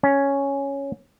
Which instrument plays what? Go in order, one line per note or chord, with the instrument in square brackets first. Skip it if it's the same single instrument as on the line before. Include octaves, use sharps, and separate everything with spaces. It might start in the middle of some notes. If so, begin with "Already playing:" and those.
[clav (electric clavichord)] C#4